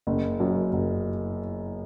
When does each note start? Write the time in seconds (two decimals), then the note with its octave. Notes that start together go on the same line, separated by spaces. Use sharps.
0.07 F#1
0.40 F#2
0.72 F#1